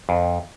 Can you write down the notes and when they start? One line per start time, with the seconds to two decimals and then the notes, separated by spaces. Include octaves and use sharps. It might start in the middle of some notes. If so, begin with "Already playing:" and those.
0.09 F2